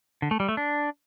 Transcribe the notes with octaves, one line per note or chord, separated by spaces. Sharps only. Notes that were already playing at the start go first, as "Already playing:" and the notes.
D3
A3
G3
A3
D4